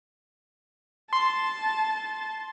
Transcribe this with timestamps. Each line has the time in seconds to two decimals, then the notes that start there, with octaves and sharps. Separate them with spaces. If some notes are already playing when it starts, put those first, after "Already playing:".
1.13 A5 C6